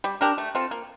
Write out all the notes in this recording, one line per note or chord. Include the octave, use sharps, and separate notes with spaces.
G3
D4 G4 A#4
A3
C4 F4 A4
A#3